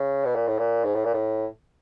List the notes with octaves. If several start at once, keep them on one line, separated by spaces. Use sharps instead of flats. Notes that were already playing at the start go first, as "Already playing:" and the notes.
Already playing: C#3
B2
A#2
A2
A#2
G#2
A2
A#2
A2